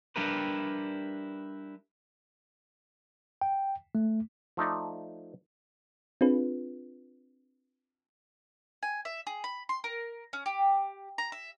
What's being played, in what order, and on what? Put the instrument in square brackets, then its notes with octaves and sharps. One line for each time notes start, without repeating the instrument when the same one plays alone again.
[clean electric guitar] G3 D4 E4 G4 A#4 B4
[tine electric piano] G5
A3
[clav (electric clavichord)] F3 A3 D#4 D5
[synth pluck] C4 D4 F4 G#4 B4
[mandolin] G#5
E5
G#4
B5
C6
A#4
C#4
G4
A#5
E5